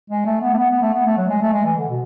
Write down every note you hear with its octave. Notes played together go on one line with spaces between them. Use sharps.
G#3
A3
B3
A3
B3
B3
A3
B3
A3
F#3
G#3
A3
G#3
E3
D3
B2